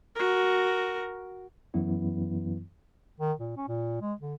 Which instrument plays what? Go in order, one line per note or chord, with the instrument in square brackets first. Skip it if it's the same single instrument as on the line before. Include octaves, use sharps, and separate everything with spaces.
[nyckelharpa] F#4 A#4
[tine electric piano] F#2 E3 F#3 B3 E4
[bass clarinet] D#3
A#2
C#4
A#2
G#3
D3